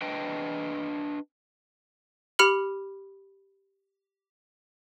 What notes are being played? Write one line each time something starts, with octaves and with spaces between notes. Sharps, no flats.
D4 B4 D#5 G5
G4 B5 F6 C#7 F#7